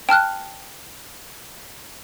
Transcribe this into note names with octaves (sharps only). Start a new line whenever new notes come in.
G5 A5 F6 F#6